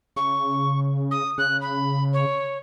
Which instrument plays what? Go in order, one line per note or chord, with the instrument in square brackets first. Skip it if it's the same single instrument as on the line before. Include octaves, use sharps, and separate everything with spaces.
[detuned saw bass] C#3 [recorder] C#6
[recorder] D#6
[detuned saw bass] C#3 [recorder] F#6
[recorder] B5
C#5